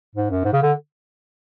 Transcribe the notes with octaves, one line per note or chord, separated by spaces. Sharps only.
G#2
F#2
G#2
C#3
D3